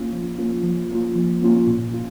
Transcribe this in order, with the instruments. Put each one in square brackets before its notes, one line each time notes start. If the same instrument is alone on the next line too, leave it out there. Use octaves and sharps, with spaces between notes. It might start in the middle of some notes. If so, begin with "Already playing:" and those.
Already playing: [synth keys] A#3 C#4 F4
F3
A#3 C#4 F4
F3
A#3 C#4 F4
F3
A#3 C#4 F4
A#2
F4